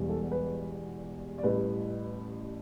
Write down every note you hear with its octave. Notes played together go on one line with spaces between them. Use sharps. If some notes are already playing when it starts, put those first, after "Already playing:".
Already playing: E1 E2 B2 G3
A4
B4
D5
A1 A2 G3 B4